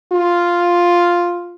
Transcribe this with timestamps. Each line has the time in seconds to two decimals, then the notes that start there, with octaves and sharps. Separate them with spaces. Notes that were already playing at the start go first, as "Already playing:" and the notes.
0.12 F4